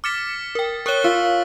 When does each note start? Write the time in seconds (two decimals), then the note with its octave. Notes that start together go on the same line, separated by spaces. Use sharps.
0.04 D6 F6 A6 B6 C#7 E7
0.55 A#4 G5
0.86 A#4 C#5 C#6 F#6 G7
1.04 F4 C#6 E6 B6